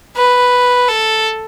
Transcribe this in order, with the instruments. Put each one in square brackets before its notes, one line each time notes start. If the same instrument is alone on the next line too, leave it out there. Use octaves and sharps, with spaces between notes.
[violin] B4
A4